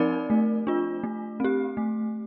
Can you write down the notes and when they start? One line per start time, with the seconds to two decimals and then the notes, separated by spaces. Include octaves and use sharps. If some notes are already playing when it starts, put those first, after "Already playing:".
Already playing: F3 C4 D#4 A#4 D5
0.30 A3
0.67 D4 F4
1.03 A3
1.40 C4 G4
1.77 A3